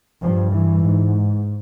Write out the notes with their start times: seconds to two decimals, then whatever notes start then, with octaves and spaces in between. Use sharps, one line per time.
0.22 G2 F3
0.52 E3
0.83 G#2